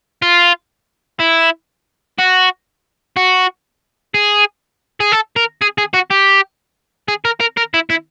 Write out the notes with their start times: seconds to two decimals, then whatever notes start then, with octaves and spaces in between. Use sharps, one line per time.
0.22 F4
1.20 E4
2.18 F#4
3.16 F#4
4.14 G#4
5.00 G#4
5.12 A4
5.36 A#4
5.61 G#4
5.78 G#4
5.94 F#4
6.11 G4
7.08 G#4
7.25 A#4
7.41 A#4
7.57 A#4
7.74 E4
7.90 E4